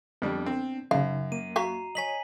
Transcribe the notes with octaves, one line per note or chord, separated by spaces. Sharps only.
F2 G3 B3 D4
C4
F#2 C#3 D#4 F5
A#3 D#7
F#4 E5 F5 A#5 C7
C#5 D#5 G#5 B6 F#7